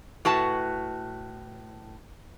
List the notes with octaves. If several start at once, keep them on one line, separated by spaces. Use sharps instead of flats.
A2 F#4 B4 A5